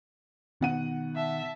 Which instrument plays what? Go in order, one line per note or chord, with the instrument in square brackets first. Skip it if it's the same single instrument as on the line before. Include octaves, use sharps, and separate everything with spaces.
[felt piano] B2 F#5 D#7 [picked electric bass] D#3
[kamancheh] E5 A5